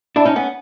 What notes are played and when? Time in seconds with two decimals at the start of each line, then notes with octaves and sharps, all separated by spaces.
0.16 D4 E4
0.25 C#4 D#4
0.36 B3 C#4